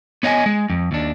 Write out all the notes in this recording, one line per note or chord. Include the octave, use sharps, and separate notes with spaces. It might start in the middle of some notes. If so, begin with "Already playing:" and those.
B3 C#5 D#5 F#5 G#5
G#3
F2
D#2 D4